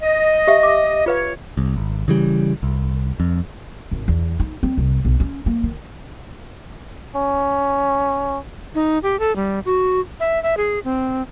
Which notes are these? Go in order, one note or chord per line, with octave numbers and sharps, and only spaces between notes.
D#5
G4 E5 F5
D6
F4 B4 C#5 F5
C2
G#1
C#3 E3 G3
C2
F2
G#1
E2
D#4
C4
C2
B1
C#4
A#3
D#3
C#4
D#4
G4
A4
G3
F#4
E5
E5
G#4
C4